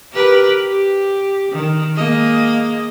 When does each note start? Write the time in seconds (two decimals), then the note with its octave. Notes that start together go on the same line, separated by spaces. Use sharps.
0.12 G4 A#4 B4
0.68 G4
1.52 D#3
1.96 G#3 A#3 D#5